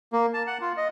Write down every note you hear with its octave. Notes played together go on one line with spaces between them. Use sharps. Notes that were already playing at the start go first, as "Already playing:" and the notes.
A#3
A5
F#5
F4
D#5